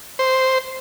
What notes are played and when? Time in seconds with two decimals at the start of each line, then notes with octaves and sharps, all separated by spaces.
0.19 C5